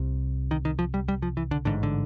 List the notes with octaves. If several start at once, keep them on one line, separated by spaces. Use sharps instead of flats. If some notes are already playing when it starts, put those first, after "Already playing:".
Already playing: C2 C3
D#3
D#3
F3
G3
G3
F3
E3
D3
A1 G#2 D3
D3